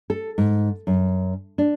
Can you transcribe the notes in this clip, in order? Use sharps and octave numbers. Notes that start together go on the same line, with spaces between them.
A4
G#2
F#2
D4